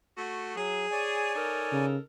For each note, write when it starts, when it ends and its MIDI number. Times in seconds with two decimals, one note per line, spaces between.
0.17 0.52 57
0.17 0.52 66
0.56 0.87 54
0.56 1.35 68
0.91 1.86 73
0.91 1.86 74
0.91 1.86 80
1.35 2.01 63
1.35 2.01 69
1.35 2.01 70
1.72 1.97 49